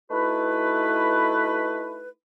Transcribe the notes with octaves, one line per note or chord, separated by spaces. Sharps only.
A3 D#4 E4 F#4 B4